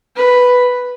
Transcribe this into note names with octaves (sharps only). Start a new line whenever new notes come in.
B4